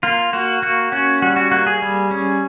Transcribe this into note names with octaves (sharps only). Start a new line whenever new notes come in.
A#3 F4
A#3 F#4
A#3 F#4
C#4 F#4
G3 F#4
F#4
A#3 F#4
G#4
G3
C#4